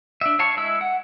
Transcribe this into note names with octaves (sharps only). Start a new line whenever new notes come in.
D4 E5
C#5 F5 A5 C#6
G#3 E4 E5 E6
F#5